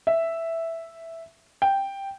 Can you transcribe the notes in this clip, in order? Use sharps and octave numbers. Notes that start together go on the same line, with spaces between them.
E5
G5